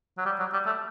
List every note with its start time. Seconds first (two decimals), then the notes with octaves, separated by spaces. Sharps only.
0.18 F#3
0.25 G3
0.39 F#3
0.53 G3
0.66 A3